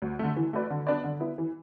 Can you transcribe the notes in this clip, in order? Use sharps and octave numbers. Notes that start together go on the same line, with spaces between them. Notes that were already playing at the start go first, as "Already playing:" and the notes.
D2
D3 A3
E3
A3 F#4 B4 D5
D3
B3 D4 B4 D5
D3
B3 E4
E3